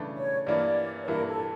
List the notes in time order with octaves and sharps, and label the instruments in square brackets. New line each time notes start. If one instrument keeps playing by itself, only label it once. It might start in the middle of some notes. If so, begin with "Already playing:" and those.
Already playing: [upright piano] C#3 E3 A3 D4
[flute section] C#5
[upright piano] G2 E3 A#3 E4 [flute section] D5
[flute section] C#5
[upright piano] G2 E3 A#3 E4 [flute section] A#4
[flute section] A4